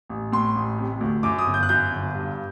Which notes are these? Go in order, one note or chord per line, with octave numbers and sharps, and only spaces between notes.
A1
A2 C6
A1
C3
D2
F#2 D6
D#6
G1
G6
F#6
F#2 G6
G1
G2